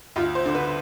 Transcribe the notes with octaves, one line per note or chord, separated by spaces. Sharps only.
D2 F4
C5
D3
B4